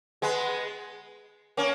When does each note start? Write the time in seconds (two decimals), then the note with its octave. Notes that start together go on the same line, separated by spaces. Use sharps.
0.22 G#3 B3
1.57 A#3 C#4